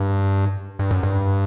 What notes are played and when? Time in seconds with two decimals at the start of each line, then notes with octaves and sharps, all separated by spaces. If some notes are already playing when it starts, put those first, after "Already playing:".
Already playing: G2
0.79 G2
0.91 F#2
1.03 G2